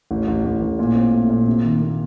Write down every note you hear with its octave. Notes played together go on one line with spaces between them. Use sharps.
A1
A1
A1
A1
A#2
C4
A3
A#2
C3
D#3
A#3